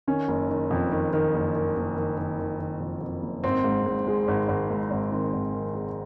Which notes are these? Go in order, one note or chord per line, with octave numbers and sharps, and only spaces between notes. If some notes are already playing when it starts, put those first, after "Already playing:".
D#3 C#4
F#1
D#3
F2
D#3
D#3
F#1
D#3
F#1
D#3
D#3
D#3
D#3
F2
F2
F#1
G#1 C4
G#2
G#2
G#3
G#1
G#1
G#2
G#1
D#3 C4
G#1
D#3
G#3